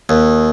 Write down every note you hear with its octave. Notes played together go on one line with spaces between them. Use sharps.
D#2